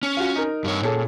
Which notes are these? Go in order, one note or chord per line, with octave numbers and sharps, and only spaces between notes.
C#4
F4 F#4
D#4 A#4
G2 C#5
A#2 C#4 G#4 A4